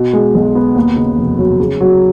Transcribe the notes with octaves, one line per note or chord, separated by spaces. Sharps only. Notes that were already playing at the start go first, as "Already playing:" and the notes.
Already playing: B2
G#3
B1
B3
D#2
C#3
F1
F#3
C#3
F#3